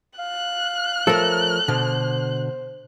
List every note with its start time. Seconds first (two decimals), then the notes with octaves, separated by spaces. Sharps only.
0.19 F5 F#6
1.07 F3 A3 A4 A#4 C#5
1.68 B2 D3 C5